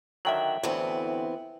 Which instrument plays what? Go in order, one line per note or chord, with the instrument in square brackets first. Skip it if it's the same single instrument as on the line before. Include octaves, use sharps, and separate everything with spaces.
[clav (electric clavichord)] D3 D#3 F#3 [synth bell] E5 G5 F#7
[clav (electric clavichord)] D2 A2 [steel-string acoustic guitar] E3 B3 C4